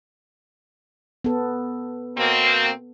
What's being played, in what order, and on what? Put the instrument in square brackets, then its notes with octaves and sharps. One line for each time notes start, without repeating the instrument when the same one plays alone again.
[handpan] B3 A4
[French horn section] B2 A#3 C4